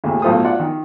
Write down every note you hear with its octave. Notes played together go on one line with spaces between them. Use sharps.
D#2 A#2 C#3 A3
B1 A2 F4 A4 C5 D#6
F4 D5 F#5
D#3